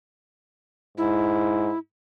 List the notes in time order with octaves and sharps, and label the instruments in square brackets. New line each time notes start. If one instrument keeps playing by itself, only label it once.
[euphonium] G#2 [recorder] E4